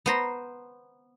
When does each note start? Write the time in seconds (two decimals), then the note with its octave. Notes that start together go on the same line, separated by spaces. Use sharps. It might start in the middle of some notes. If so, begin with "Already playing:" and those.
0.06 B3 C5 A#5